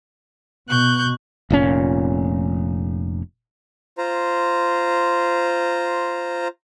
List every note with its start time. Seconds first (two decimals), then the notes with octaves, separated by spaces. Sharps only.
0.69 B2 C#6 F#6 G6
1.50 F1 A#2 C#4
3.98 F4 C5 A#5